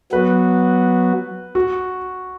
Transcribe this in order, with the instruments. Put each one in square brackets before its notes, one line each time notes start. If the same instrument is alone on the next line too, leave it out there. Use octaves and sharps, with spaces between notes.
[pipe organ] F#3 B3 F#4 [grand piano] B4
[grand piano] F#4